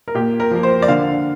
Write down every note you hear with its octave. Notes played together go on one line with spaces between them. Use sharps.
A#4
A#2 G4
A#4
F3 A#3
C5
D5
D3 F5